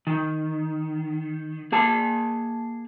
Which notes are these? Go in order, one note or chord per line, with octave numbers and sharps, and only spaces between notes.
D#3
A#3 G#4 A5